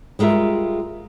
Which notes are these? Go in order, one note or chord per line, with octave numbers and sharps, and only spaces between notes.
G3 G#3 F4 A#4 E5